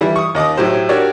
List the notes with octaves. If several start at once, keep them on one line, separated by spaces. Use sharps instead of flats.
E3 G3 E4
C#6 D#6
D#2 D#5 D6 D#6
A2 F#3 G4 C5
D4 F#4 G4 A#4 C#5 D5